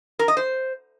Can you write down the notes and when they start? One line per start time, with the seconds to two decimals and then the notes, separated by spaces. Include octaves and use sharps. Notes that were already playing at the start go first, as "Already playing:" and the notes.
0.19 A#4
0.28 D#5
0.37 C5